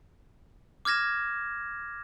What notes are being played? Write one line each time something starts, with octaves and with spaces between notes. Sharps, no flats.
D6 F6 G#6 A#6 E7